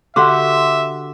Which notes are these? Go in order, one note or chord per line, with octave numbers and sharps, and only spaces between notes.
D3 F#4 G4 E5 F#5 C6 D6